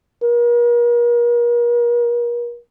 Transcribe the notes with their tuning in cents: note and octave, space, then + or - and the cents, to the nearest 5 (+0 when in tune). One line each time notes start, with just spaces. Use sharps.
A#4 +40